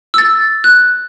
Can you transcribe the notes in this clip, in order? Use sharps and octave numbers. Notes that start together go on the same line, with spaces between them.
E6 A6
F#6